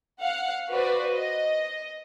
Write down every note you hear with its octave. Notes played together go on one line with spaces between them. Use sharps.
F5 F#5
F#4 B4 C5 D5
D#5